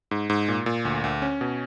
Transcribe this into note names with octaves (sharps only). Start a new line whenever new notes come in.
G#2
G#2
A#2
A#2
D2
D2
C#4
B2